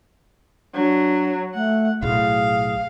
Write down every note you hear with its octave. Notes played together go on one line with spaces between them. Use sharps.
F#3 D4
A3 F#5
B1 A2 G#4 F5